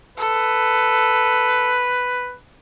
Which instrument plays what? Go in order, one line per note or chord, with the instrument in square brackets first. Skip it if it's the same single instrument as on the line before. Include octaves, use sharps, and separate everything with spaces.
[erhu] A4 [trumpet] B4